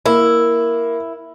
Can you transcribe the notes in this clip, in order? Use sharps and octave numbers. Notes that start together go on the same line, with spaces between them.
A#3 E4